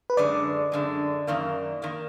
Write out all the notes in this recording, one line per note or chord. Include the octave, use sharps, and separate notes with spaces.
B4
F#2 D3 G#3 D5
F#2 D3 G#3
F#2 D#3 A#3
D#3 A#3